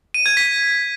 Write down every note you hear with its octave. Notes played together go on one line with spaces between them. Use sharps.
D#7
G#6
B6